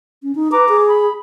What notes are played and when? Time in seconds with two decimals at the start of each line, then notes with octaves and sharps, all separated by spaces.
0.23 C#4
0.35 D#4
0.52 B4 A#5 D6
0.69 G#4
0.89 B5